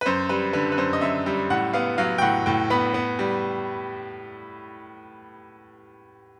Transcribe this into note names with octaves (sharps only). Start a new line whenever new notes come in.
B4
F#2 C5
G3 B4
D3 B4
B4
F#2 C5
D#5
F#2 E5
G3
A2 F#5
B3 F5
F#3 F5
G5
A2 F#5
A2 G5
B3 B5
B3
G3